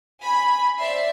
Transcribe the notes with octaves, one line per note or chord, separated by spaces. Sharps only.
G#5 B5
C5 D5 E5 C7